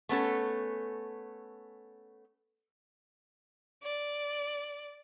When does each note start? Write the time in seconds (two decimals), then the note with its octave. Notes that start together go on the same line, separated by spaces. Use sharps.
0.09 A3 B3 C#4 A4
3.82 D5